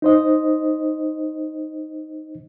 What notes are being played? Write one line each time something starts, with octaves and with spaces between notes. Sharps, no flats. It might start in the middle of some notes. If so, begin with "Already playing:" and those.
D#4 C5 D#5